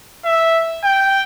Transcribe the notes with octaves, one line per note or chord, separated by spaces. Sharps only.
E5
G5